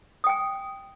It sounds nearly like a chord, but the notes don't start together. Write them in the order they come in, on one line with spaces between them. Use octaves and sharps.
D#6 G5 G#5